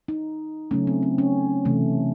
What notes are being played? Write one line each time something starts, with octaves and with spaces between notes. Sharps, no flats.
D#4
C#3 F#3 A3 C#4
C4
C4
C#4
C3 E3 A3